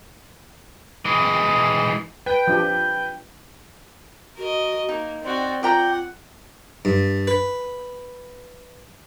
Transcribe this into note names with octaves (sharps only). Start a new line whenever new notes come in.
E3 G#3
B4 G5
F3 D4 G4
F#4 A#4 D#5
A#3 D#4
C4 F#4 D5
F4 D5 F#5 G5 A#5
G2
B4